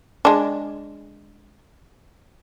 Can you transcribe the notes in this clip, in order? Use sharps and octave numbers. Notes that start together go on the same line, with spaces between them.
G#3 D4